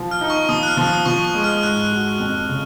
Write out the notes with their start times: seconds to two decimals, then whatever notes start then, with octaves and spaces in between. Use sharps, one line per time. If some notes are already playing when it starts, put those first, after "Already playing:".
Already playing: F3
0.11 F6
0.21 D#4
0.30 C#6
0.48 F3 D#6
0.63 F#6
0.68 F6
0.77 F3
0.87 D#6
1.06 F3 C#6
1.25 C#6
1.34 G#3
1.44 F6
1.63 G#2 F#6
1.92 F#4
2.19 F2
2.49 C#3